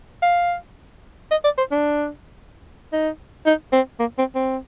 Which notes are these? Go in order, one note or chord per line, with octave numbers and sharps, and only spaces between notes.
F5
D#5
D5
C5
D4
D#4
D#4
C4
A#3
C4
C4